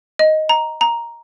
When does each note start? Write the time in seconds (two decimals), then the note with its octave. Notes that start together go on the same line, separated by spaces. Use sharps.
0.19 D#5
0.49 A#5
0.81 A#5